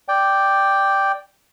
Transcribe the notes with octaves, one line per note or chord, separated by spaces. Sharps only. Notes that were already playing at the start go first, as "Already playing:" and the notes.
D5 G5